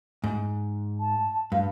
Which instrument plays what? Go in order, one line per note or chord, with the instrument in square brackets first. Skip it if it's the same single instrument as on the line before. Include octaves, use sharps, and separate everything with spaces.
[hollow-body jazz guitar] G#2
[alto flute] A5
[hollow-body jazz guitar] G2 [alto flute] F5